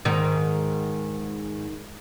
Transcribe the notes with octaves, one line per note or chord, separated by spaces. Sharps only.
G#2 D#3